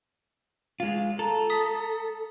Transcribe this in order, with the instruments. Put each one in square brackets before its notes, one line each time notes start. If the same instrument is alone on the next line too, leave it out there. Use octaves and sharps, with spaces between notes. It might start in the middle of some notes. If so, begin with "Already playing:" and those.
[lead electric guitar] G#3 F4
[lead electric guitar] A4 [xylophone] A5 A#5
[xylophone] D#6 B6